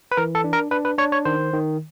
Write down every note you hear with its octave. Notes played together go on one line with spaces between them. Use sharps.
B4
E3 A#4
A4
D4
A#4
D4 B4
B4
D4 C#5
C#5
D#3 C5
D#3